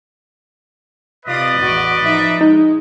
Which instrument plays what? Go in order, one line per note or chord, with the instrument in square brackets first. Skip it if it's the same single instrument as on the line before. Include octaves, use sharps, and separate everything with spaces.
[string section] C3 F4 D#6 [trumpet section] B4 D5 D#5
[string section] A1 E2 F#4
F3 D#4 E5
[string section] G#3 [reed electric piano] D#4